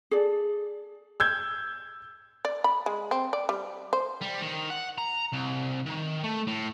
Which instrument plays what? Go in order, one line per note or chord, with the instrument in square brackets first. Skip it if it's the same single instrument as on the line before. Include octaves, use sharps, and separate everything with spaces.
[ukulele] G#4 A4 D5
[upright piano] E6 G6 G#6
[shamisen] D5
B5
G#3
C4
D5
G3
C5
[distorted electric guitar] G3
D#3
F#5
A#5
C2
D#3
A3
A2